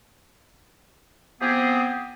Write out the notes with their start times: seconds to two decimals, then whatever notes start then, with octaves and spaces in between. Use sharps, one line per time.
1.41 F3 B3 C4 G4 G#4